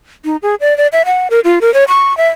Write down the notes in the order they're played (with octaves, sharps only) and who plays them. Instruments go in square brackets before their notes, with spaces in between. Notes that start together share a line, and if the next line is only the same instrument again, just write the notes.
[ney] D#4
G#4
D5
D5
E5
F#5
A#4
F4
A#4
C#5
C#6
E5